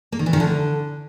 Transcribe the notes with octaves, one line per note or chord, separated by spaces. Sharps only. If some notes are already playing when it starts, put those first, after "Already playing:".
A#3
D#3
E3
D#3
D3